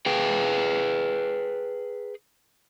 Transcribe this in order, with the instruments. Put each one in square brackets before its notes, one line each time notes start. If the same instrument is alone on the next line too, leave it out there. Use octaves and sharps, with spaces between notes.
[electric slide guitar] G#4 B4 G5